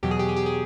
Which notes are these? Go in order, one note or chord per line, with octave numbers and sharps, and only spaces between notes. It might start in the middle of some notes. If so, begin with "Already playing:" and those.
E2 B2 F#3 G4
G#4
G4
G#4
G4
G#4